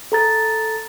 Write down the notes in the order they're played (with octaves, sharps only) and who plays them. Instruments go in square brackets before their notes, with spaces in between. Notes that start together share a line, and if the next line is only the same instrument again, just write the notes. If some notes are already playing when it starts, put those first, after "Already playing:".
[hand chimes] A4 A#5 A6